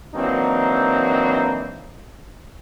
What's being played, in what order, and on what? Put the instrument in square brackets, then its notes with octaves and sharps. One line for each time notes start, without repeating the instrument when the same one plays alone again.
[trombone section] E3 F#3 A#3 C4 D4 D#4